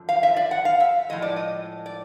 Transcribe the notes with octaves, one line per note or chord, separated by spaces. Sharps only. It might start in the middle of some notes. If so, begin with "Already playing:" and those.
Already playing: F#2 D3 F3
F5
E5
D5
F#5
F5
E5
A2 F3 G#3 D#5
D5
D#5
D5